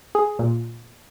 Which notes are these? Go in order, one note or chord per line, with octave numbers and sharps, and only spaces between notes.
G#4
A#2